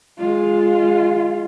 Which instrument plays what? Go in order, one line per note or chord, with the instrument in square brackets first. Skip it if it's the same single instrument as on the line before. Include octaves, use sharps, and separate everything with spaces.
[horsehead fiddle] G#3 F4